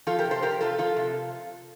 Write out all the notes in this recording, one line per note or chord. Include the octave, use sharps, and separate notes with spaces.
F3 F4 A4
G4 A#4
C3
A4 C5
F3 G4 A#4
C3 F4 A4
F3 F4 A4
C3